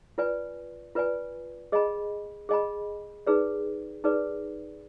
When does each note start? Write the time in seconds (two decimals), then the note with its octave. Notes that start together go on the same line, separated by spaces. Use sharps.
0.18 F4 B4 D5 G#5
0.95 F4 B4 D5 G#5
1.72 G#4 D#5 G#5 B5
2.49 G#4 D#5 G#5 B5
3.27 D#4 G#4 B4 D5
4.04 D#4 G#4 B4 D5